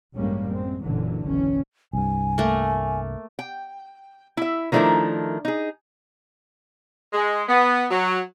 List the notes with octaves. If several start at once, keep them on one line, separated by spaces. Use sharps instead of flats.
A1 G2 G3 G#3 A#3 C#4
F#2 G#3 C4
F#1 A#2 D3 E3 F#3
F#1 B1 E3 C#4
C2 G2 G#5
A3 A#3
G5
E4 E5
D#3 F3 A3 D4 E4 A#4
D#4 G#4
G#3
B3
F#3